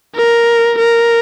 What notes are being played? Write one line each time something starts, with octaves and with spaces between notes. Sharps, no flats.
A#4
A#4